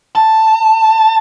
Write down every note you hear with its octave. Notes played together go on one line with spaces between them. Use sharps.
A5